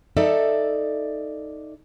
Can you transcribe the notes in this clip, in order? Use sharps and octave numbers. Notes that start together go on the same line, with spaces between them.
D#4 A4 D5 E5